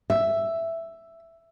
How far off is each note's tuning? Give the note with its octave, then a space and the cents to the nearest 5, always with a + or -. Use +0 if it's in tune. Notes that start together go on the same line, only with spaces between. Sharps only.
E5 +5